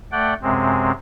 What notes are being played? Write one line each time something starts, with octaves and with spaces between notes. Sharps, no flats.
A3 D5 F#5 G5
F#2 C3 G#3 C4